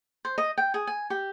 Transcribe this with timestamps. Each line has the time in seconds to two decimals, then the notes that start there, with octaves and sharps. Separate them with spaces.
0.25 C5
0.38 D#5
0.58 G5
0.74 G#4
0.87 G#5
1.10 G4